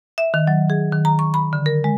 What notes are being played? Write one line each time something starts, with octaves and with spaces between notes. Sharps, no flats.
E5
D#3
F#3
G#4
D#3
A#5
C#6
B5
D3
A#4
G#3